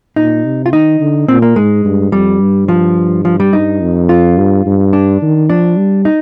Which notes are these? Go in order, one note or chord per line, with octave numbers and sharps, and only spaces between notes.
A#2 D#4
C3
F4
D#3 D#4
D3
A#2 C4
A#3
G#2 G#3
G2
F2 G3
G2
F3
F3
G3
G2 D#4
F2
F4
G2
G2
D4
D#3
F3 D4
G3
D#4